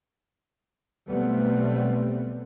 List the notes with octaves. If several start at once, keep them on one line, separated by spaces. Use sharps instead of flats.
B1 G3 A3 B3 C4